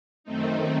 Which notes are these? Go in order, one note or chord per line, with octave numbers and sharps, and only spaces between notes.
F#2 D#3 A3 C4 D#4